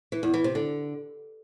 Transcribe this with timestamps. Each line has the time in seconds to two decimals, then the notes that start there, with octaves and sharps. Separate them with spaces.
0.12 E3
0.23 E2
0.34 E3
0.44 C3
0.55 D3